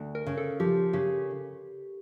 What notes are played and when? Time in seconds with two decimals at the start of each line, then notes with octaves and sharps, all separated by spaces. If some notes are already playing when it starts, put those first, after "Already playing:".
Already playing: D2
0.15 A#4
0.27 C#3
0.37 A4
0.60 F3 G4
0.93 C#3 G4